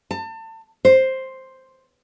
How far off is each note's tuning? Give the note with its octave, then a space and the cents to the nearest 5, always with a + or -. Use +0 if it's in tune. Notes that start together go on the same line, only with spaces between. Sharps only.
A5 +30
C5 +5